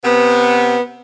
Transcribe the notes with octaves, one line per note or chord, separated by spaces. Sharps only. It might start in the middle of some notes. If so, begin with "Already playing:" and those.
C3 B3